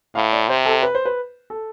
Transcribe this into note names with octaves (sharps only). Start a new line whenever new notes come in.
A2 F5
D5
C3 C5
A4
B4
C5
B4
A4